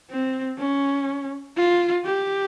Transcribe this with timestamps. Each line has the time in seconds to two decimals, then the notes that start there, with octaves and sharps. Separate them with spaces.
0.10 C4
0.59 C#4
1.57 F4
2.05 G4